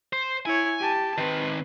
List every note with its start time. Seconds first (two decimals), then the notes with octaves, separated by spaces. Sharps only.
0.13 C5
0.46 E4 C#5 G#5
0.80 G4 A5
1.18 D#3 C4 B4